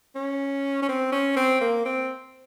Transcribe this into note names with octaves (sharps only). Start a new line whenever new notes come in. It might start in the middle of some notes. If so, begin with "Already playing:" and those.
C#4
C#4
C4
C#4
C4
A#3
C4